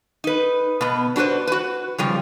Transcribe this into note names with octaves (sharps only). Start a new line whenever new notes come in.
D#4 B4
B2 B3
D4 F#4 G4 B4 C5
F#4 B4
C#3 F3 G3